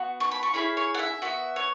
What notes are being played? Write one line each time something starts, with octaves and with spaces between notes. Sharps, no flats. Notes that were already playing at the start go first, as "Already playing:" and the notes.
Already playing: B3 F#4
C#6
B5
C#6
C#4 E4 G#4 B5
C#5
F#5
E5
B3 F#4 E5
C#5